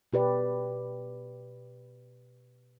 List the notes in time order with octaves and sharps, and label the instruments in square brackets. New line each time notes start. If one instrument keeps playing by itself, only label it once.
[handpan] B2 G4 B4 D5